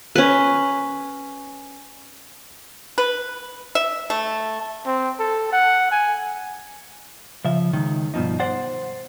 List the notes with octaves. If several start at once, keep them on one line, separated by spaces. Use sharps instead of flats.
C#4 B4
B4
E5
A3
C4
A4
F#5
G#5
C#3 F3 E5
C#2 D#3
G2 B2 F3 D#4
C5 D5 F#5